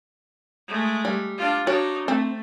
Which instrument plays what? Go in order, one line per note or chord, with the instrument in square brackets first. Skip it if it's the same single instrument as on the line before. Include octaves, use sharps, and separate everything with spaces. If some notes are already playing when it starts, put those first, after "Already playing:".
[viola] G#3 A3
[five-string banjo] G3
[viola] D4 F4
[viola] D4 D#4 [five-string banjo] F#4 C#5
[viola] A3 [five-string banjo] C4